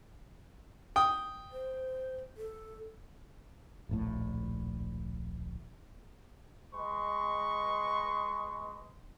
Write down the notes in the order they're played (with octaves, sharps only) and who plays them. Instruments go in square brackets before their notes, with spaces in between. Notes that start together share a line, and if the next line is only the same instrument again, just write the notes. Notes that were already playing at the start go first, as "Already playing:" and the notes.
[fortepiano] G5 D#6
[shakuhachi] C5
A4
[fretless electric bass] D1 A#1 A2
[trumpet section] G#3 B4 D#5 C6 C#6